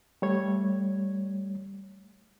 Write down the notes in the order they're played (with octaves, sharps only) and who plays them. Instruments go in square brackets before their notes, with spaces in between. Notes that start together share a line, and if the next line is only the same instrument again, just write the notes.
[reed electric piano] G3 A3 C#5 G#6